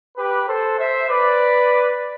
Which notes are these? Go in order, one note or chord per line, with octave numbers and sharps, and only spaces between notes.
G4 B4
A4 C5
C5 E5
B4 D5